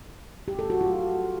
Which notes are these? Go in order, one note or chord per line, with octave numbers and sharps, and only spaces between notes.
G4
A4
F#4
F4